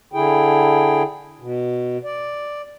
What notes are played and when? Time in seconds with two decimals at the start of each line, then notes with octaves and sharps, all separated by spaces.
0.13 D3 E4 G#4 G5
1.40 B2
2.04 D5